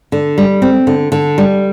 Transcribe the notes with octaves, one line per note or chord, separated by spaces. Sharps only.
D3
G3
C4
D3
D3
G3